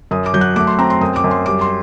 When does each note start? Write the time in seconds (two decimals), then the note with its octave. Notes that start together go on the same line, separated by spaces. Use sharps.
0.11 F#2 D#6
0.26 D6
0.34 F#3 G6
0.41 F#6
0.56 A3 D6
0.67 C6
0.79 C4 A#5
0.90 C6
1.01 F#2 D#6
1.16 D6
1.24 F#2
1.31 C6
1.46 G3 D6
1.61 C6